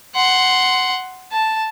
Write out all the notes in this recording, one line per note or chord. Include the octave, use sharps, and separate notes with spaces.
F#5 C6
A5